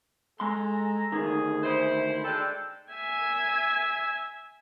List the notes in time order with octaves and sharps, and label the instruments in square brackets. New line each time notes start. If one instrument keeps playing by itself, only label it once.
[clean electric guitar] G#3 C6 [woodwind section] A4 G#5 A#5
[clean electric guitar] D2 D#3 [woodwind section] G#4
[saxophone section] E4 C5
[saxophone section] G#3 D4 A4 [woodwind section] G5
[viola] E5 G#5